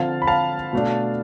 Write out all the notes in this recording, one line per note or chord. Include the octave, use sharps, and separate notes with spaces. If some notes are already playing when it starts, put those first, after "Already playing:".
Already playing: D3 F3 C4 F5 A5
B5
F5 A5
B2 A3 D4